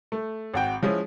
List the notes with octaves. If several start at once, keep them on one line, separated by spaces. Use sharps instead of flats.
A3
G#1 F#4 G5
F3 G#3 C#4 E4